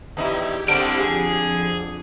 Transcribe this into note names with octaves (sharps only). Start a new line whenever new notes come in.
E2 D#4 E4 G4
D3 G3 C4 D7
F2 G#4